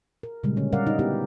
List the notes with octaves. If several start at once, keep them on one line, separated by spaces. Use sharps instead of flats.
A#4
A#2 C#3 G3 G#3
D3 C#4
G3 C#4 A#4 D5 F5 F#5
D#4
B3 D#4 E4 G4